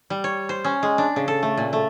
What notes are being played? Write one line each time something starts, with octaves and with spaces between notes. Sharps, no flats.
G3
C#5
C5
C#4
G#3
D4
C#3
A4
A3
A#2
A3